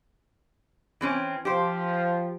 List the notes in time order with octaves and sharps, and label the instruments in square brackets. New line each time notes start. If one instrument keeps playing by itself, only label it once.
[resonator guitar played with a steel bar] E3 C4 C#4
[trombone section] F3 [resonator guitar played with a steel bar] G4 C5